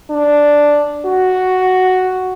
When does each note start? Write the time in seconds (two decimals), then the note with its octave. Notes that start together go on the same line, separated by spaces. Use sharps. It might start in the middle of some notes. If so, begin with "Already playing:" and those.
0.11 D4
1.05 F#4